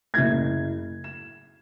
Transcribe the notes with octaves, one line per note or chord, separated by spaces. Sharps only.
F#1 E4 G#6
E7